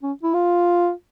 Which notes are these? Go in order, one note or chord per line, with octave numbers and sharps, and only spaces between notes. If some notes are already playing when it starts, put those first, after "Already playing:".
C#4
E4
F4